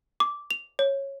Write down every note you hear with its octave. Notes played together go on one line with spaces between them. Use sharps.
D6
F7
C#5